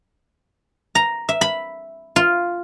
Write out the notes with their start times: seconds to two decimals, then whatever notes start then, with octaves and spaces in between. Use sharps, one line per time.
0.95 A#5
1.29 E5
1.41 B5
2.16 F4